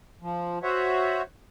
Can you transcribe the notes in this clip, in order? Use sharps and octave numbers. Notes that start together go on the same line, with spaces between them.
F3
F#4 C5 C#5 E5 F#5